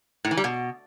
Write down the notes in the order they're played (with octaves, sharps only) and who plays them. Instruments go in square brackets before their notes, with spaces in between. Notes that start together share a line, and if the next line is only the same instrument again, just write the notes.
[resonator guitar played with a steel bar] A2
E3
G3
B2